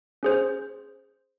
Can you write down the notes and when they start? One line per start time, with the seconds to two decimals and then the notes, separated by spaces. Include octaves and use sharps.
0.23 C#4 G#4 C5